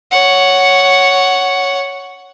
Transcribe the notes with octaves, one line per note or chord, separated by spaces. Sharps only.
C#5 F#5